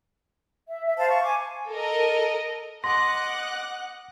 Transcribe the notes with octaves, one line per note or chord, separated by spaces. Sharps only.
E5
E5
C5 F5 A5
C#6
G#5 D6
A4 A#4 D#5
D#5 F#5 A5 C6 D6 F#6 A#6